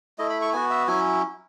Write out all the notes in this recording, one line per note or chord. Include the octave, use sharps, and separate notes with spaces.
A3 E4 D#5
B5
C#6
B3 F#4 G#5
E5
F#3 C#4 E4 G#5